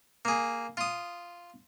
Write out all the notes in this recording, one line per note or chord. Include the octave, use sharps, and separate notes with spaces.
A#3 G#4
F4 D#6